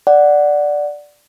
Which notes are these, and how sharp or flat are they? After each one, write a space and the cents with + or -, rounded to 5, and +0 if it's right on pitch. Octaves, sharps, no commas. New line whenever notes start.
D5 +0 F#5 +0